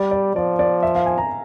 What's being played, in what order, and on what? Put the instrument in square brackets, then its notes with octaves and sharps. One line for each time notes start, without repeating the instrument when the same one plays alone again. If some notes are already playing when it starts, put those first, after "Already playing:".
Already playing: [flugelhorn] G3 [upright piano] D5
[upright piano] D5
[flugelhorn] F3 [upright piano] D5
[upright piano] D5
E5
F5
G#5
A#5